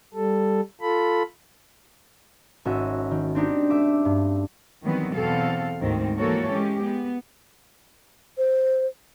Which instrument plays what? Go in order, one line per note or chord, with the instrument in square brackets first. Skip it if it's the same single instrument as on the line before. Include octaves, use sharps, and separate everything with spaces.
[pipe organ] G3 A4
F4 A4 B5
[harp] G#1 C#4 F#4 E5
D#3
C4 D4 D#4 G4
A3 E5 D6
G2
[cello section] D#3 E3 F#3 G3 B3 C4
E2 B2 C4 A4 F5
D2 G#2 D#3 C4
E3 F3 A#3 F#4 A4 C#5
G#3 C#4 G4
B3
[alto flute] C5